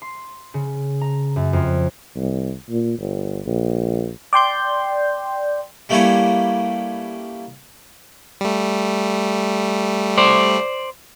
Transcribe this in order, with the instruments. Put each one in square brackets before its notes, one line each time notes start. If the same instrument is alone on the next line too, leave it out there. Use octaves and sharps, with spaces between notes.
[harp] C6
C#3
A#5
F#2
F2
[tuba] C2
A#2
G1
A#1
[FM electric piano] D5 G5 C6 G6
[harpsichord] G3 A3 A#3 C#4 E4 C#5
[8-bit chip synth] G3 A3
[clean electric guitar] C5 D5